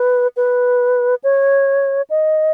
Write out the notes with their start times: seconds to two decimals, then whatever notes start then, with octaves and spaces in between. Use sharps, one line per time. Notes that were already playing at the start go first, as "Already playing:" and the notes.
Already playing: B4
0.37 B4
1.24 C#5
2.10 D#5